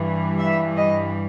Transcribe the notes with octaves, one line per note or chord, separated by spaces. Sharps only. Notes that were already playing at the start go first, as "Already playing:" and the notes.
Already playing: G2 E3 G3
E5
D#5